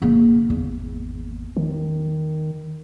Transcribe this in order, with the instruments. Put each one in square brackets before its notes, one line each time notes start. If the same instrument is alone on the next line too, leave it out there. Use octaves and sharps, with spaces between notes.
[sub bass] F1 [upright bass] C#3 A#3
[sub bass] G#1 [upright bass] E2
[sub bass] D#3